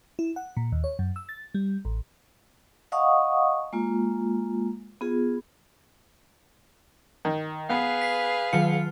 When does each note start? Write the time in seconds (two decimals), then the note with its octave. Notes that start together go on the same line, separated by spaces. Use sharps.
0.19 E4
0.36 F#5
0.57 A#2
0.72 D#2
0.84 C#5
0.99 F#2
1.16 E6
1.29 A6
1.55 G3
1.85 A1
2.92 D#5 F5 F#5 A5 C#6 D#6
3.73 G#3 A#3 F4
5.01 B3 F4 G#4
7.25 D#3
7.69 B3 G#4 B4 F5
8.01 B6 C7
8.53 D#3 F#3 F4 C#7